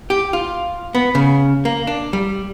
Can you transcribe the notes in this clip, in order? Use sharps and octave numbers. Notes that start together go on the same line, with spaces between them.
G4
F4
B3
C#3
A#3
D4
G3